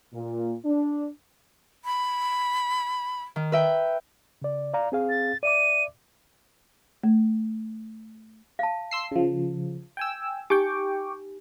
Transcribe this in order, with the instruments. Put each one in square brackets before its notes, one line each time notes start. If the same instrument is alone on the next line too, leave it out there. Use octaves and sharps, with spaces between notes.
[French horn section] A#2
D4
[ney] B5
[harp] D#3
B4 E5 G5
[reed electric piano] C#3 D5
D5 F5 A#5
C4 G#4 F5
[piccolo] A6
[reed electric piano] D5 E5 D6 [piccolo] D#7
[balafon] A3
[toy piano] F5 A5
[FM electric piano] C6 E6 C7
C#3 F3
G5 G#5 E6
[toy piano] D#4 G4 G#5 [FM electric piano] G5 C#6 D6